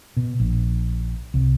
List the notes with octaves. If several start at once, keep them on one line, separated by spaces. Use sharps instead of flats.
B2
A#1
C2